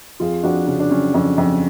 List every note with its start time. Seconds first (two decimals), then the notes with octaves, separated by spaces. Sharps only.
0.20 F2 F4 G#4
0.43 F2 D4 F#4
0.67 C#3 C#4
0.80 D4
0.91 F#3 C#4
1.14 F2 C#4
1.38 F2